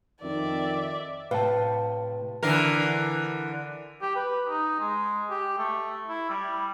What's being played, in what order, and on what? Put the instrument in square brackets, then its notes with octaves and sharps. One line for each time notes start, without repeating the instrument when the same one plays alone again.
[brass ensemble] F2 D#3 [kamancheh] D5 E5
[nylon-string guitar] A2 C3 [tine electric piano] B4 [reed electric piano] F5 A5
[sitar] D3 E3 A#4
[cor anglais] G4
B4
D#4
G#3
G4
A3
E4
G3